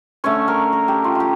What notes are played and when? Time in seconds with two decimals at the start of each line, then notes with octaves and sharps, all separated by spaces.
0.24 D3 A3 C#4 C#5
0.48 A#4
0.73 A#4
0.88 G4
1.04 F4
1.15 F4 G4